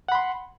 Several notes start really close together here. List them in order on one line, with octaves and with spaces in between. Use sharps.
F#5 B5 C6